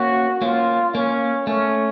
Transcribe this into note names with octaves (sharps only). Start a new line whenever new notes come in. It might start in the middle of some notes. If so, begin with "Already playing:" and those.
Already playing: A#3 C#4 F#4
A#3 C#4 F4
A#3 C#4
A3 C#4